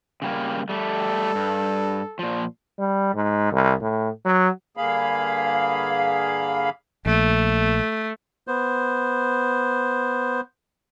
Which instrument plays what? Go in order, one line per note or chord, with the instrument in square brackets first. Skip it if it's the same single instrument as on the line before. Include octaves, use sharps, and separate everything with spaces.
[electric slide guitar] C#3 G3 A#3
[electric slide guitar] G3 A3 [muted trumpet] A4
[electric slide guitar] G2
A#2 F3
[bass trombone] G3
G#2
C2
A2
F#3
[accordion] G2 D3 A#3 G#4 F5 B5
[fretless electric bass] A#1 [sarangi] A3
[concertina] B3 C5